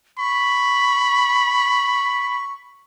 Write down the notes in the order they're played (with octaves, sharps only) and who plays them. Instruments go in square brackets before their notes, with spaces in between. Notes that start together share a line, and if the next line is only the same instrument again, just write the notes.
[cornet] B5 [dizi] C#6